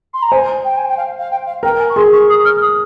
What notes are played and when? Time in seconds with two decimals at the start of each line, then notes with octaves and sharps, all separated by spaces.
0.14 C6
0.22 A#5
0.32 C5 G#5
0.64 G5
0.78 G#5
0.88 G5
0.97 F5
1.19 F5
1.31 G5
1.46 F5
1.63 A#4 G5
1.80 G#5
1.90 C#6
1.96 G#4 C6
2.13 C#6
2.29 D#6
2.45 F6
2.62 D#6